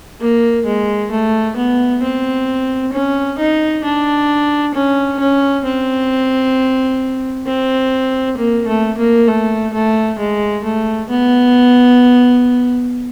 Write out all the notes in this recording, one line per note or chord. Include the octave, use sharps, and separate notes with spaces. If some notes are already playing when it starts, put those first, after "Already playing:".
A#3
G#3
A3
B3
C4
C#4
D#4
D4
C#4
C#4
C4
C4
A#3
A3
A#3
A3
A3
G#3
A3
B3